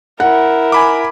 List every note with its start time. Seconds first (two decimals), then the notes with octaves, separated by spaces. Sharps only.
0.20 E4 A#4 F#5
0.72 G#5 B5 D6